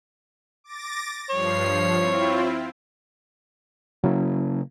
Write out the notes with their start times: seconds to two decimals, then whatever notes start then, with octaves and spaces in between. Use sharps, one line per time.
0.64 D6 A6 A#6
1.30 G2 F3 C#5 C7
1.99 C4 E4 F4
4.04 C#3 F#3 A#3 C#4 E4